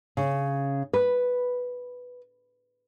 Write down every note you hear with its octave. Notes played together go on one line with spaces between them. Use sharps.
C#3
B4